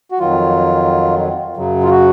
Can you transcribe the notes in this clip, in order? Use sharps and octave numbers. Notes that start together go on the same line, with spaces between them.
F#4
F2 D#3 F#3 F4
F#2 C#3 F#3
F4
F#4